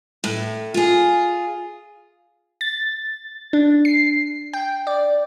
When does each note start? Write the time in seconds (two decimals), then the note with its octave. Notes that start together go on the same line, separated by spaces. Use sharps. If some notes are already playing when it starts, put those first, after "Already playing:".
0.24 A2
0.74 F4 G#4
2.61 A6
3.53 D4
3.85 C7
4.53 G5
4.87 D5